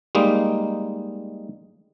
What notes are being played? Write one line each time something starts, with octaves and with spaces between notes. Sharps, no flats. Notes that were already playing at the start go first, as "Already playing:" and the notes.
G3 G#3 A#3 D#4